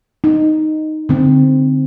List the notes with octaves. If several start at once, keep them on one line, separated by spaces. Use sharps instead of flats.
D#4
D3 C4